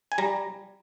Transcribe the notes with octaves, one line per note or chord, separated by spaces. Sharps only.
G#5
G3 A#5